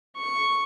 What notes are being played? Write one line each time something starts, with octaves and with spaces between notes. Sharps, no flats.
C#6